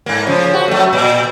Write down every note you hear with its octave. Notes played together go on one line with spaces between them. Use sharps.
G#2 A#3
C#3 F3
F#4
F#3 A3
A#2